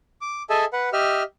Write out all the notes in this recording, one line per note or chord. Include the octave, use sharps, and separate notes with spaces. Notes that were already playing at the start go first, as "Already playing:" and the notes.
D6
G#4 A4 D#5 E5 G#5 A5
B4 F#5
G4 D#5 E5 F6